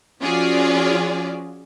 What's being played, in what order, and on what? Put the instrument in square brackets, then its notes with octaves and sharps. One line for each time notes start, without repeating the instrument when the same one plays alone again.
[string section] F3 C#4 F4 F#4 G#4 D5